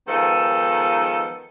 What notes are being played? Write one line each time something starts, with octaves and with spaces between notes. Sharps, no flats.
D#3 F3 G#3 B3 A4